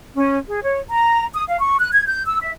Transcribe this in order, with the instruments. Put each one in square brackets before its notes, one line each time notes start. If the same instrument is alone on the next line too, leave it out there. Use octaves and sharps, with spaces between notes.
[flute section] C#4
G#4
C#5
A#5
D#6
F5
C#6
F#6
G#6
G6
E6
E5